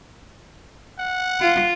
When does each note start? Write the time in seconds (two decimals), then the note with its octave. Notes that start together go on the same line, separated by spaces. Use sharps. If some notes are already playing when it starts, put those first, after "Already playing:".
0.99 F#5
1.40 F4